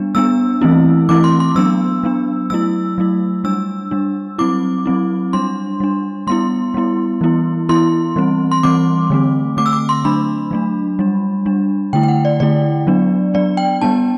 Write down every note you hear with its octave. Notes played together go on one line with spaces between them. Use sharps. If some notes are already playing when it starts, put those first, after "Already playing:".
Already playing: G3 B3 D4
G3 B3 D4 E6
E3 A3 C4 E4
E3 A3 C4 E4 D6
C6
C6
F#3 B3 D4 E6
F#3 B3 D4
F#3 A3 E4 E6
F#3 A3 E4
G3 D4 E6
G3 D4
F#3 C4 E4 D6
F#3 C4 E4
G3 D4 C6
G3 D4
G3 B3 E4 C6
G3 B3 E4
E3 B3 E4
E3 B3 E4 C6
E3 G3 C4
C6
E3 G3 C4 D6
D3 A3 C4
D3 A3 C4 D6
E6
D6
C6
F#3 A3 D4 B5
F#3 A3 D4
G3 D4
G3 D4
D3 A3 E4 G5
G5
F#5
D5
D3 A3 E4 D5
F#3 B3 D4
F#3 B3 D4 D5
G5
G3 B3 D4 A5